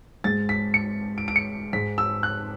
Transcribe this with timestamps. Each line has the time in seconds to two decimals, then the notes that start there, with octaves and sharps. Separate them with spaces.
0.24 G#2 G#3 A6
0.49 B6
0.74 C#7
1.18 D7
1.28 D7
1.36 C#7
1.73 G#2 G#3 B6
1.98 E6
2.23 F#6